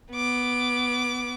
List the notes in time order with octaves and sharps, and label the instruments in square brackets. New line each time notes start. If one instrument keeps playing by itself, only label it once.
[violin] B3 D6